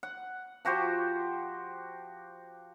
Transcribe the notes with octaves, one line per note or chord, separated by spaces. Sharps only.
F#5
F3 F#4 G4 C5